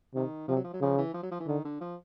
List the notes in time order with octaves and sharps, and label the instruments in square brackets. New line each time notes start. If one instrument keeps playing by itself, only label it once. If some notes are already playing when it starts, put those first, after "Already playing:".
[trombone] C3 [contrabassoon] D#3
[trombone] C3 [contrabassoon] F3
[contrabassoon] F#3
F3
F#3
[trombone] C#3 [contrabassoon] F3
[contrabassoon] E3
F3
F#3
F3
E3
[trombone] D3 [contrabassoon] D#3
[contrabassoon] D3
F3